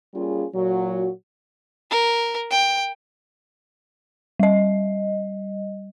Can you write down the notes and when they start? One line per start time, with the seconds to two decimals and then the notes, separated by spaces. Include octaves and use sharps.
0.14 G3 A#3 C#4 F4 G#4
0.54 A#2 F#3 F#4
1.91 A#4
2.51 G5
4.40 G3 D#5